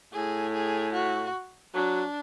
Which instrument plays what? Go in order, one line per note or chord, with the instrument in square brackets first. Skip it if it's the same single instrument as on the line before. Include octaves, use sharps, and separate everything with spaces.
[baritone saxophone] A2 [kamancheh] G#4
[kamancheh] G#4
F#4
[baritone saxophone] F#3 [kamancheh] D4